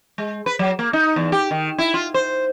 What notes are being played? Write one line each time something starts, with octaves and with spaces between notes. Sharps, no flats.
G#3
B4
F#3
A#3
D#4
E2
G4
D#3
E4
F4
C5